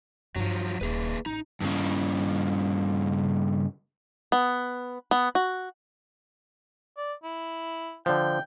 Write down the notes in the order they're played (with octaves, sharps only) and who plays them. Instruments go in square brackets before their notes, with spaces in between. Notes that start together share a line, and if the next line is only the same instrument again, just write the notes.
[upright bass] G2 E4 [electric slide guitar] F3 F#3
[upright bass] D#1 [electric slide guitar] A#3 G#4 B4
[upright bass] A1 [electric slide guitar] D#4
[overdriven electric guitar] G2 C#3
[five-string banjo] B3
B3
F#4
[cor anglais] D5
E4
[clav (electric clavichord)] D3 F3 [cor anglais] G5